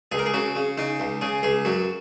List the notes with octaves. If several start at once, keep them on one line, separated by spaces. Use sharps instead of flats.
C#2 G#4
A#4
G#4
C#3 F#4
C#3
C#3 D#4
C#2
C#3 G#4
C#2 G#4
F#2 F#4